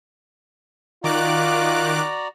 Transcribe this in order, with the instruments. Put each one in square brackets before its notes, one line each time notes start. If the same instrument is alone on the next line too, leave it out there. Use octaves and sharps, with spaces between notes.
[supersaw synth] D#3 D6 F#6 [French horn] F4 [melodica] F#4 D5 A#5